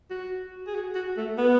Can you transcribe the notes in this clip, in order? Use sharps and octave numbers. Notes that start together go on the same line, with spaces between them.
F#4
G#4
F#4
F#4
A3
B3